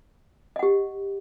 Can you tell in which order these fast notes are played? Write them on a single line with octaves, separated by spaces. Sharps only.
D#5 F#5 G4